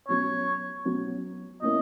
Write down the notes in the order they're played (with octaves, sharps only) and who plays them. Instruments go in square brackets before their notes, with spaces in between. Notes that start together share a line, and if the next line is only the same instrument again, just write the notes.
[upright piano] B2 F#3 C#4 [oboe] C#5
[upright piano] B2 F#3 C#4
[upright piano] B2 A#3 C#4 E4 [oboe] D#5